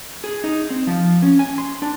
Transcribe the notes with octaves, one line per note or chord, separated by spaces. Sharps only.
G#4
D#4
C4
F3
C#4
G#5
C6
D4